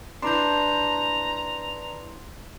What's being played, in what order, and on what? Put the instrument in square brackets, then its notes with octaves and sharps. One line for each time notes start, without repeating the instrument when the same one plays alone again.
[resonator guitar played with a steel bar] D4 [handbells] E4 B4 D5 [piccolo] A#5 [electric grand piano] C6 G6